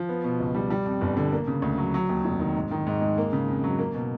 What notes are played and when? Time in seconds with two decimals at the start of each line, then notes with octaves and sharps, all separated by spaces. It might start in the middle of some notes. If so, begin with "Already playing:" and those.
Already playing: F3
0.09 B3
0.24 B2
0.40 C#2
0.55 G3
0.70 G3
0.85 F2
1.01 G1
1.17 D3
1.32 A#3
1.47 C#3
1.62 D2
1.78 F#3
1.94 F#3
2.09 D#2
2.25 F1
2.39 D#3
2.56 G#2
2.71 D#3
2.87 G#2
3.01 G#3
3.18 A#3
3.33 C#3
3.48 F2
3.64 F#3
3.79 A#3
3.94 B2